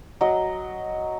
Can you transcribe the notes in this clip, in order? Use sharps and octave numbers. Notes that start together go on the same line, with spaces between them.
F#3 D#5